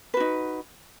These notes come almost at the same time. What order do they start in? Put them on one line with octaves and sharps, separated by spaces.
B4 F#4 D#4